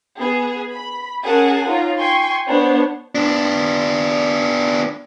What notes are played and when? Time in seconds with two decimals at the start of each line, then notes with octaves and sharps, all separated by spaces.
0.18 B3 G#4
0.74 B5
1.24 C#4 G#4 A#4 F#5 G#5 A5
1.66 D#4 F4 C#5 A#5
1.98 G5 G#5 C6 C#6
2.47 B3 D4 C5 C#5
3.15 B3 D4